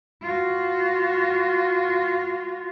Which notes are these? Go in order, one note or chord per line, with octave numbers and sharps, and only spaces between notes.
F4 F#4